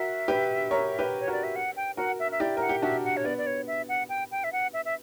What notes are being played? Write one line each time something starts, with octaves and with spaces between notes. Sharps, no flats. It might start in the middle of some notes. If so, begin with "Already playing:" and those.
Already playing: F#4 A#4 E5
G4 B4
A#4 C#5
G4 B4
C#5
F#4 A#4 D5
E5
F#5
G5
F#4 A#4 F#5
E5
E5
E4 G4 D5
A#4 F#5
G4
D4 F#4 E5
F#5
C#5
B3 D5
D5
C#5
E5
F#5
G5
G5
E5
F#5
E5
E5